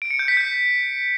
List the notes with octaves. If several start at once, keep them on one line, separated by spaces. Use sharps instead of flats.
D7
C#7
G6
B6
G6